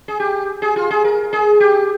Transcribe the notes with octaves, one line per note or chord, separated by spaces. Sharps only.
G#4
G4
G#4
F4
G#4
A#4
G#4
G4